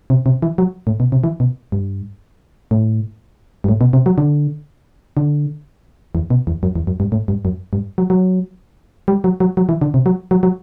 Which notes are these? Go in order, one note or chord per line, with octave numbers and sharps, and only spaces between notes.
C3
C3
E3
F#3
A2
B2
C3
E3
B2
G2
A2
G2
A2
B2
C3
F#3
D3
D3
E2
B2
E2
F#2
E2
F#2
G2
A2
G2
F#2
G2
F#3
F#3
G3
F#3
F#3
F#3
E3
D3
C3
F#3
F#3
F#3